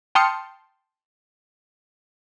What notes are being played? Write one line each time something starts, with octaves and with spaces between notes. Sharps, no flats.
G5 A5 C6 D#6 F6 C#7